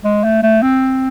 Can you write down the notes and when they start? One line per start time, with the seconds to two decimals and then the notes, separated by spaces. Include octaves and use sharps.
0.04 G#3
0.24 A3
0.43 A3
0.63 C4